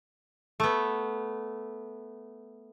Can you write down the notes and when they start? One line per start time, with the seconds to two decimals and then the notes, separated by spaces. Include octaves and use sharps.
0.60 A3 B3